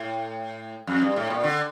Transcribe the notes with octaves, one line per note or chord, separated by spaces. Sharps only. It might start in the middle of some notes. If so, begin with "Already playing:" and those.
Already playing: A2
F2
G2
A2
A#2
D3